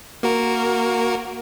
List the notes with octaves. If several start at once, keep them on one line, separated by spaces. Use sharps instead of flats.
A#3 F#4 A#4